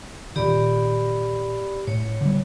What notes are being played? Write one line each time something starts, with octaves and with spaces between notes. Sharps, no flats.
A#2 D#3 G4 D5 B5
A2 C#5
D3 G3